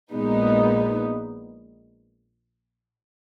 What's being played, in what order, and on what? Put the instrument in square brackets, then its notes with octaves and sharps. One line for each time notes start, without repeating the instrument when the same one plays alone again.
[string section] A#1 A#2 G#3 B3 D#4